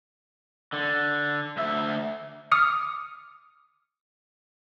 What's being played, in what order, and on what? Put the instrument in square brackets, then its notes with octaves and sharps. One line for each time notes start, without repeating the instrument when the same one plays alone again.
[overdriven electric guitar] D3
D2 E5
[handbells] D6 D#6 F6 C#7